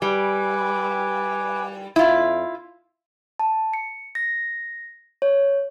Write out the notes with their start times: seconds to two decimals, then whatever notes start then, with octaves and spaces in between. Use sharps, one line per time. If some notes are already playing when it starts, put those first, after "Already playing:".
0.02 G3 B4 G#5 D6
1.96 F2 E4 F4
3.39 A5
3.73 C#7
4.15 A#6
5.22 C#5